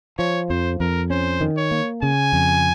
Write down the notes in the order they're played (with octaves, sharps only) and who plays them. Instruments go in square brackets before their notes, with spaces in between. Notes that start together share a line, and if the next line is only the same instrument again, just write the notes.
[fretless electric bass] F3 [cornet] C#5
[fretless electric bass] F2 [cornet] C5
[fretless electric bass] F2 [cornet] A#4
[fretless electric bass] C#4 [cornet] C5
[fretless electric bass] D#3
[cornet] C#5
[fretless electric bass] A#3
[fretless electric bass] C#3 [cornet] G#5
[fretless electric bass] F2